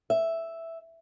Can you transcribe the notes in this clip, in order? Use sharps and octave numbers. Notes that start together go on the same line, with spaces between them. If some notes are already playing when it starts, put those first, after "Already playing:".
E5